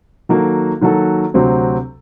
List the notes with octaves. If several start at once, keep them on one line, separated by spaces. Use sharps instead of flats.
D#3 F#3 A#3 F#4 A4
D#3 F#3 A#3 F#4 A4
D2 C3 F#3 C4 F#4